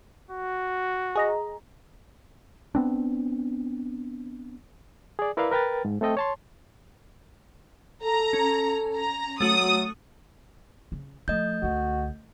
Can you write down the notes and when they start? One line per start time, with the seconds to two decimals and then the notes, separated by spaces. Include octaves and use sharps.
0.31 F#4
1.16 G#4 D#5 A#5
2.75 B3 C4 D4
5.19 G#4 D5
5.37 E4 A#4 B4 D5 E5 F5
5.51 A#4 B4 G5 F6 A6
5.85 G#2
6.01 A3 C4 A4 D#5 G5
6.17 C#5 A5 C6
8.03 A4 A#5
8.33 C#4
8.95 A#5
9.41 F#3 A3 F#4 D#6
10.92 C#3
11.28 F3 A3 D#5 G6
11.62 C#2 D3 F#4